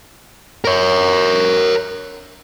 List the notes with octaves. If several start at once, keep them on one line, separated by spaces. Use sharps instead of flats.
A#4 C#5